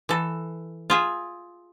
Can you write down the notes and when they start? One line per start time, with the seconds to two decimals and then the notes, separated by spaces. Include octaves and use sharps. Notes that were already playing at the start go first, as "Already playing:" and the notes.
0.09 E3 A4
0.90 F4 G#4 E5